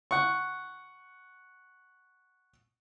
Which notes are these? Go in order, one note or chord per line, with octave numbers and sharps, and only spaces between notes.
F#5 C#6